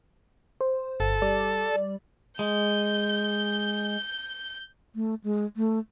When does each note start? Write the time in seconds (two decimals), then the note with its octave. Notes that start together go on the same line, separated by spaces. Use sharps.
0.61 C5
1.00 G1 A4
1.22 G3 D5
2.39 G#3 G6
4.95 A3
5.24 G#3
5.57 A3